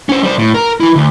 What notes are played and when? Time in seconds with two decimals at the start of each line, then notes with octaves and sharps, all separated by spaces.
0.09 C#4 C5
0.23 G3 C5
0.39 A2
0.54 A#4
0.80 E3 E4
0.96 D2